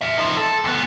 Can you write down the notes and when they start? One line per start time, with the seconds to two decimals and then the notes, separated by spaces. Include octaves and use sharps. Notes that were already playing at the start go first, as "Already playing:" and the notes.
0.01 A#4 E5
0.18 F3 D#4
0.37 A4
0.64 D2 B3